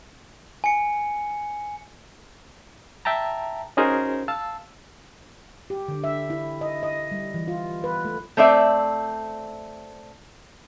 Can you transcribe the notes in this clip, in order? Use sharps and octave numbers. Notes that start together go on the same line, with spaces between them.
G#5 C#7
E5 G5 A5 A#5
C#4 D#4 F#4 G#4 A#4 C5
F5 A5 E6
G4
D3
E5
E4
D#5
D#5
G3
E3
F4
B4
A3
A3 C4 D5 E5